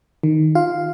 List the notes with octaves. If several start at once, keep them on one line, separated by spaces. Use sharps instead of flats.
D#3
F4 F5